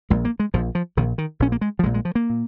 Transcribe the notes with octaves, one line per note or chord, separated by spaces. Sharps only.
A#1 A#2 G#3
A#3
G#3
A#1 A#2 F3
F3
A#1 A#2 D#3
D#3
A#1 A#2 C#4
A#3
G#3
F3
A#1 A#2 G#3
G#3
F3
A#3
A#2